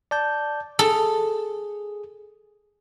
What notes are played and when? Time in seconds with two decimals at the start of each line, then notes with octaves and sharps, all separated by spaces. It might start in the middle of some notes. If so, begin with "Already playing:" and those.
0.11 D5 A5 G6
0.79 G#4 A4